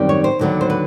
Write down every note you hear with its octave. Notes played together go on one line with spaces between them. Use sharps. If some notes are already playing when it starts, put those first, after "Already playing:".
Already playing: F#2 D#3 G3 C4
C#5
C5
D#2 D3 F#3 B3
C5
B4